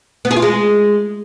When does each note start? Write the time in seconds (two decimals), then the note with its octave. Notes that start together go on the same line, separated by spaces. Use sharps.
0.25 B3
0.31 G#4
0.36 F4
0.42 G#3